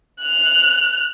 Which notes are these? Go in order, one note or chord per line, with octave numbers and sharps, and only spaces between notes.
F#6 F7